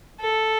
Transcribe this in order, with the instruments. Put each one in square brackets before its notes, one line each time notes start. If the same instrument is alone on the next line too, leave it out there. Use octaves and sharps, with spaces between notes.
[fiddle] A4